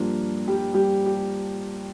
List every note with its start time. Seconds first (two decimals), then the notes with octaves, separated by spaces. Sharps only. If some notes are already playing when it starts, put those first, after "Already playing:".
Already playing: G2 F3 A#3 D4 F4
0.47 G3 G4
0.74 G3 G4
1.06 G4